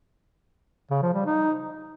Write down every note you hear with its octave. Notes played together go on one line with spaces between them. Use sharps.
C#3
F3
G3
D#4